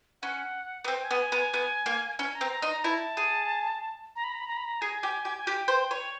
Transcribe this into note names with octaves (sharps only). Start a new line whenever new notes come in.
C#4 F#5
B3
C4 G5
G#5
B3
G#5
B3
G#5
B3
A#3
C#4 G#5
A#5
C4
A#5
D#4
A#5
E4 A5
G#4
A#5
B5
A#5
B5
A#5
B5
A#5
G#4 G#5
G4
G4
G#5
G4 G5
C5
C#5